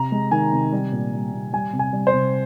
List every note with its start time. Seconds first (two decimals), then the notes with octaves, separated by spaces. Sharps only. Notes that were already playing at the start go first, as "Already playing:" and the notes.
Already playing: C3 A#5
0.12 G#3
0.31 D#3 G#5
0.53 C3
0.72 G3
0.92 A#2
1.13 G3
1.33 A#2
1.52 G3 G#5
1.73 C3
1.79 G#5
1.93 G3
2.07 C5
2.14 C3